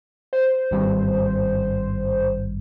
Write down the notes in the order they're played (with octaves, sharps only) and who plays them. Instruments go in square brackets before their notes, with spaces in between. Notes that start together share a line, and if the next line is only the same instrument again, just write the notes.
[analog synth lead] C5
[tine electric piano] G#1 G2